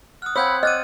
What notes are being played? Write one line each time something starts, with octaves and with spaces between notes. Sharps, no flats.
F#5 D#6 F6
C4 C#5 F5 F#5 B5 E6 G6 G#6
D5 D#5 F#5 F6 A6 D#7